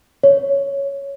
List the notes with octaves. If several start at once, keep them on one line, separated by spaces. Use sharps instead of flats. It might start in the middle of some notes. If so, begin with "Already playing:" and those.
C#5